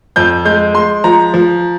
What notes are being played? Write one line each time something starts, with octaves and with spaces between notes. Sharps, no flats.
F2 G6
G#3 G6
G#3 C6
F3 A#5
F3